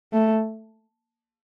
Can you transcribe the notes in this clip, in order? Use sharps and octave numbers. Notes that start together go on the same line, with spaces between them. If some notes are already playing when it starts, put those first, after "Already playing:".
A3